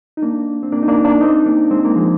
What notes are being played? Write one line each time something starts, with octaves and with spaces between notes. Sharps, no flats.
D#4
A#3 D4
C4
A#3 D4
D#4
A#3 D4
A#3 D4
C4 D#4
A#3 D4
G#3 C4
A#3
F3 G#3